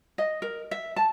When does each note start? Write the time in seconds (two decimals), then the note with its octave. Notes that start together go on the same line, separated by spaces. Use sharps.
0.18 D#5
0.42 A#4
0.71 E5
0.96 A5